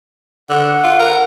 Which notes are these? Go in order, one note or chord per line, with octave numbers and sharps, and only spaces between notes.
D3 F#5
F4
A#4